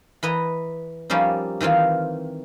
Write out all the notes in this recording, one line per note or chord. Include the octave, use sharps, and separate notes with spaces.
E3 B4 D#5 A#5
F3 G3 A#3 C#4 D#4
D#3 E3 C4 F4